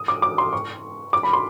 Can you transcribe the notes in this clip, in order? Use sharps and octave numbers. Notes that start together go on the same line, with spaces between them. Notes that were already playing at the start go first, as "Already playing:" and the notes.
Already playing: D#6
D6
D6
C6
C#6
D6
B5
C6